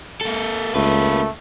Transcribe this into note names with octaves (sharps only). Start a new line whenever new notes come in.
A#3 A4
C#2 A3 A#3 B4